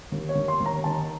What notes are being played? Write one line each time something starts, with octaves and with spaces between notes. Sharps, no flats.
D#2
C#5
D#2
C6
D#2
A#5
D#3 A5